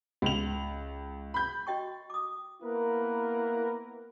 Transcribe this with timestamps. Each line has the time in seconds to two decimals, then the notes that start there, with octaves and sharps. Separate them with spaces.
0.22 C#2 F7
1.34 B5 G6
1.67 F#4 D#5 G5 C#6
2.10 D6 D#6
2.62 A#3 B3 E4 A#4 B4